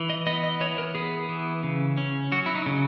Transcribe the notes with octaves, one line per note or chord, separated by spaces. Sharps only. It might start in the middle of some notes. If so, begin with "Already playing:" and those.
Already playing: E3
D#5
B3 D#5
D#5
E3 C#5
A#4
B3 G#4
E3
C#3
C#4
F#3 F#4
E4
D#4
C#3